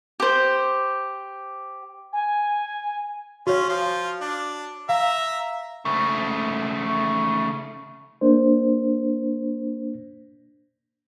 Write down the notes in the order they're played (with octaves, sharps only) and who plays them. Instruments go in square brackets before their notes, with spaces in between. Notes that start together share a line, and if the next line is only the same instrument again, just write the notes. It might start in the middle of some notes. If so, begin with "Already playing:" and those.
[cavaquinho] G4 C5
[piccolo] G#5
[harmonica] C#4 F4 [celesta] F#4 C#5
[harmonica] F3 F4
D4
[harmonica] E5 A#5 [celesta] F5
[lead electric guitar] C#3 A3
[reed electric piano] A#3 D4 C5